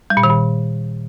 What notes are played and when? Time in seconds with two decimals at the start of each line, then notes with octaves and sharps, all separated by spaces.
0.10 G3
0.17 A#2
0.24 D#3
0.30 A#2